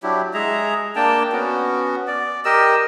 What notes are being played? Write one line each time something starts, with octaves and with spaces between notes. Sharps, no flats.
F#3 D4 E4 G4
G#3 G#4 E5 A#5
A#3 D4 G5 A5
B3 C#4 F#4
D5
G4 A#4 D#5 E6